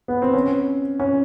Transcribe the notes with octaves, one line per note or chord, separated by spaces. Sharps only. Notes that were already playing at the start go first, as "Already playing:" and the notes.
B3
C4
C#4
C#4